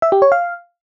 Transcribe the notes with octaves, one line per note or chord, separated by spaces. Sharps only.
E5
G4
C#5
F5